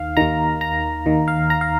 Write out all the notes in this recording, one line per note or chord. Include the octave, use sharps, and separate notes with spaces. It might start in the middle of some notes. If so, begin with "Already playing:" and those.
Already playing: D#2 D#3 F5
D#2 D#3 A#5
A#5
D#2 D#3
F5
A#5
F5